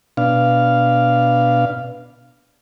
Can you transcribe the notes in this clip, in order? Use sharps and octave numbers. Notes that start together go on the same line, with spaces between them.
B2 D4 F5